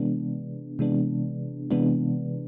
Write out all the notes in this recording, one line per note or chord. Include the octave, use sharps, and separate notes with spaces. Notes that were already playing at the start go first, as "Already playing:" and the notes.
Already playing: C3 E3 G#3 B3 D4
C3 E3 G#3 B3 D4
C3 E3 G#3 B3 D4